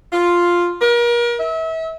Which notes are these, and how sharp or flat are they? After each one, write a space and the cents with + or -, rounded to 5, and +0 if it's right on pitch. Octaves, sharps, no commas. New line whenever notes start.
F4 +0
A#4 +35
E5 -35